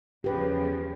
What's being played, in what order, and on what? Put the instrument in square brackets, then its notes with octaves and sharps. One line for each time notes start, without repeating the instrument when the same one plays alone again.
[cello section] E2 C#3 F3 [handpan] G4 B4